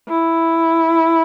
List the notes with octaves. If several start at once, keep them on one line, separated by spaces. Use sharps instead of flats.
E4